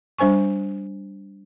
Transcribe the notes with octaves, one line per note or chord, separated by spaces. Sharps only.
G3 D4 C5 G#5 C#6